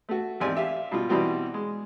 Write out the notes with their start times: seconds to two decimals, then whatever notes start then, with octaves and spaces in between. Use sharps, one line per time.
0.09 A3 F#4
0.40 G#1 E2 C4 G4 D5 G#5
0.55 G4 E5 F5
0.92 B2 G3 F4
1.09 B2 E3 G3 C4 F#4
1.54 G#3